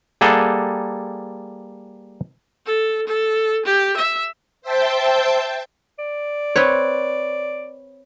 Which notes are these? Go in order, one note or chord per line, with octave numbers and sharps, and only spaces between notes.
G3 A#3 G#4 A4 F#5
A4
A4
G4
E5
C5 E5 G5 A5 G6
D5
C4 B4 C#5